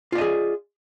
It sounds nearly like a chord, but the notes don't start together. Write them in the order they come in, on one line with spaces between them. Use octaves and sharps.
F4 D5 D#5 G#4